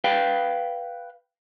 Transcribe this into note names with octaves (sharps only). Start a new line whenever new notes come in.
B4 F5 G5